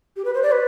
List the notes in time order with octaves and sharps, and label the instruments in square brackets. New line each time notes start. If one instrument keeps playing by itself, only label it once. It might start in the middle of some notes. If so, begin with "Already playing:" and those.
[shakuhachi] G4
B4
C5
D5
B4